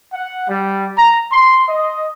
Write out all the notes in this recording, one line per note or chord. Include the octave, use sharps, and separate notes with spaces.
F#5
G3
A#5
C6
D#5